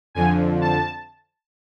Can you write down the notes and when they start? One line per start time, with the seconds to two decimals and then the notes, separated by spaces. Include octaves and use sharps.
0.15 F2 D3 F3 G#5
0.61 A5